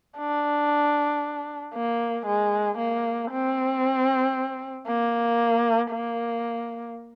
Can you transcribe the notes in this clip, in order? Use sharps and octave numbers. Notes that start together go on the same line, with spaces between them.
D4
A#3
G#3
A#3
C4
A#3
A#3